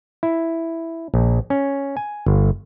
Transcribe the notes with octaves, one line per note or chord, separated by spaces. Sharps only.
E4
A#1
C#4
G#5
G1